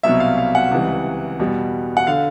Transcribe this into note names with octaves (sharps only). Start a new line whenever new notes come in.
C2 B2 F#3 E5
F5
F5
F#5
C#2 C3 E3 G3
E2 B2 G3
F#5
D3 F5